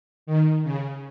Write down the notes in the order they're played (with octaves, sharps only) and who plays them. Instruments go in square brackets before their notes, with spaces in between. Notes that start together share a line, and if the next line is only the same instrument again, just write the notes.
[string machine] D#3
C#3